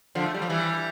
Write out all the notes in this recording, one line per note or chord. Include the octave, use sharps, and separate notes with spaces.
D3 F3
A3
G3
F3
E3 G3